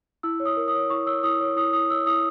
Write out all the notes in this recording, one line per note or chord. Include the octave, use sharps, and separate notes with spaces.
E4 E6
C#5
D#6
A#4
D#6
C#5
E4 C#6
C#5 E6
E4 D#6
C#5
E4 D#6
E4 D#6
C#5 E6
E4 D#6